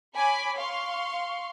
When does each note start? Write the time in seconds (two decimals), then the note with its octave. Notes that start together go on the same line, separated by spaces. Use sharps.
0.15 C#5 G#5 B5 D6
0.57 F5 C6 C#6